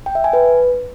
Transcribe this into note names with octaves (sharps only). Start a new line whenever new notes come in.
G5
E5
G#5
B4